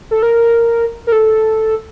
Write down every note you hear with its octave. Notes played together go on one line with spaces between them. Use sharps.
A4
A#4
A#4
A4